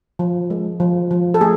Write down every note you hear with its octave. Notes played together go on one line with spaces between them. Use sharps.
F3
G#3
F3
F3
A4
A3 G#4